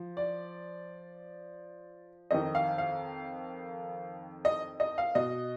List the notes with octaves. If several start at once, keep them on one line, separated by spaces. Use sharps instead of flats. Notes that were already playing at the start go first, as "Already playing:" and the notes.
Already playing: F3
D5
F2 D#3 D#5
F5
F5
D#5
D#5
F5
B2 D#5